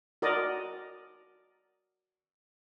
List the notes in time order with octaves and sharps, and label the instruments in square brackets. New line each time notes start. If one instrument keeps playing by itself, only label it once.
[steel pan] F#4 A#4 D5 D#5